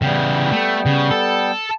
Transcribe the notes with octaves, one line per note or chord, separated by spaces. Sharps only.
C#3 E3 G3 B3 G5
A3
C#3
A4